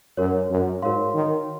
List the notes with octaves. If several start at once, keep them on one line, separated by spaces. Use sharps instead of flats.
F#2 F#4 A#4 C#5
F#2
G#2 F#4 A#4 C#5 F5 C6
D#3